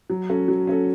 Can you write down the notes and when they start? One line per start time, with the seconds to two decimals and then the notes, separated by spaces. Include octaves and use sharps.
0.10 F#3
0.30 C#4 F#4 A4
0.48 F#3
0.67 C#4 F#4 A4